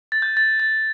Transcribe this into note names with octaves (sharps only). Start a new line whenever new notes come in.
A6
G6
A6
A6